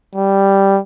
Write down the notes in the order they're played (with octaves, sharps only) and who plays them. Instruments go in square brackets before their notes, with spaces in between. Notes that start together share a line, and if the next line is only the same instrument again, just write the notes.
[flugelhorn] G3